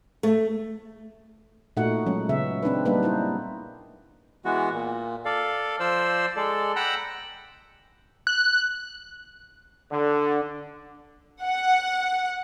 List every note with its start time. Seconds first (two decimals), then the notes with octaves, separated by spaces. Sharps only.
0.23 A3
1.77 A#2 A3 D#4 F#4 F#5
2.07 F#3 G#3 C#4
2.29 C#3 B3 E5
2.63 C4 D4 D#4 B4
2.85 G3 A#3 B3 D4 D#4 B4
3.03 D#4 E4 C5
4.45 E3 G#3 B3 F#4
4.73 A#2
5.25 A4 D5 F5
5.80 F3 C5 D5 C6 E6
6.36 G#3 A4 D5
6.76 F#5 G5 A#5 B5 E6 F#6
8.27 F#6
9.91 D3
11.42 F#5